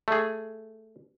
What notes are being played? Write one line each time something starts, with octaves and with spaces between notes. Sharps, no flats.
A3 G#4